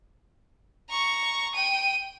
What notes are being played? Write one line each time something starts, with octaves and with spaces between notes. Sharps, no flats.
A#5 C#6
G5 D#7